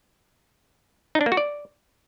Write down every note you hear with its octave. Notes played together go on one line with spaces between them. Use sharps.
D#4
D4
A#3
F#4
D5